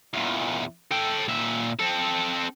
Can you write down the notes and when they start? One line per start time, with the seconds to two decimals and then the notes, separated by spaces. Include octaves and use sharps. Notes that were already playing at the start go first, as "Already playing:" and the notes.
0.14 E2 A#2
0.91 A4 G5
1.28 A#2 E5
1.79 C4 A4